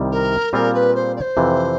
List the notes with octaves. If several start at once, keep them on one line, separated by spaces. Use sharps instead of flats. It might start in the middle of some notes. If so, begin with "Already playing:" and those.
Already playing: C2 C3 D#3 G3
A#4
A#2 G3 C4 F4 G#4 A#4
B4
C5
D5
C5
F2 C3 E3